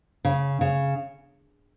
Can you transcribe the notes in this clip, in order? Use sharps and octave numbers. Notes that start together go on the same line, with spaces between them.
C#3
C#3